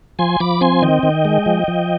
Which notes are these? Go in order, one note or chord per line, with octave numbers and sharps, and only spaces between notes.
F3 G#5 C6
F3 B5 D6
C4 G#5 C6
D#3 D#5 G5
D#3
G#3
F3
F3